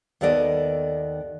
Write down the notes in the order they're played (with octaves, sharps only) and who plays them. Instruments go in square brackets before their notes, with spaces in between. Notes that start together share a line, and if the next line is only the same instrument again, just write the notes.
[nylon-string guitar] D#2 D#3 B3 A4 D5 D#5